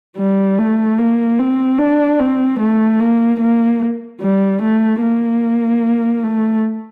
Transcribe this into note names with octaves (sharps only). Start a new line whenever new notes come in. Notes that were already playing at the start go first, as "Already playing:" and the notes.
G3
A3
A#3
C4
D4
C4
A3
A#3
A#3
G3
A3
A#3
A3